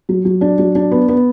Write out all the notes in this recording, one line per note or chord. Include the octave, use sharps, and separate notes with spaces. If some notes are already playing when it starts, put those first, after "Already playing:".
F#3
F#3
D4
F#3
D4
B3
B3